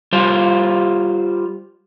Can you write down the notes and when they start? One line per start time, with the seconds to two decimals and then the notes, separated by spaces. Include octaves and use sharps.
0.13 G3 F4 C5